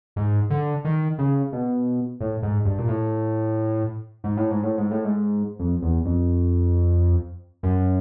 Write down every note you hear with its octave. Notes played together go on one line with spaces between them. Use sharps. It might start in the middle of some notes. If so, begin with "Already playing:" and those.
G#2
D3
D#3
C#3
B2
A2
G#2
G2
A#2
A2
G#2
A2
G#2
A2
G#2
A2
G#2
F2
E2
F2
F#2